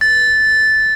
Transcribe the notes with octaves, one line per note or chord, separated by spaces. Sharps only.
A6